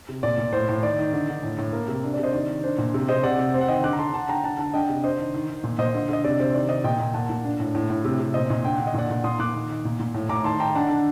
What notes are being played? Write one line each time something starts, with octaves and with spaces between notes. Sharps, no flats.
C3
A#2 D5
A#2
A2 C5
A2
D#3 D5
D#3
D3
D3
A2
A2
A#3
C3
D4
D5
C3 C5 D#5
D#3 D5
D#3
D4 C5
A#2
C3
C3 C5 D#5
C3 D5 F#5
C3
C4
F#5
D#3 D#5 G5
D3 D6 F#6
A#5
D3 A5 C6
D3 F#5 A5
D3 G5 A#5
D3 F#5 A5
D3 F#5 A5
D4 D#5 G5
C3
D4 C5 D#5
D#3
D#3
D#3
A#2
A#2 C5 D#5
D3
D3 D#5
C3 D5
C3 C5
D#3 D5
D#3 C5 D#5
A#2 D#5 G5
A#2
A#2 F#5 A5
A#2
D4
A2
A2
A2
C3
C3
A#2 C5 D#5
A#2
D3 G5
D3 F#5
D#5
A#2 D5 F#5
A#2
A#2 C6 D#6
A#2 D6 F#6
D#3
D#3
A#2
A#2
A2
A2 A#5 D6
D#3 A5 C6
D#3 G5 A#5
D4 F#5 A5
D3